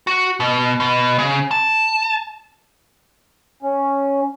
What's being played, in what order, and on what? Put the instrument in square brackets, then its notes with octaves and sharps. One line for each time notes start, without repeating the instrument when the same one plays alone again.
[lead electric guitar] F#4
B2
B2
C#3
A5
[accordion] C#4